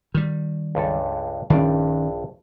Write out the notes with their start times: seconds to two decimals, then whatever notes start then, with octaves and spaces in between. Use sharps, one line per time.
0.14 D#3 G3
0.75 C#2 G2 A4
1.50 A#1 G2 D#3 C#4 D5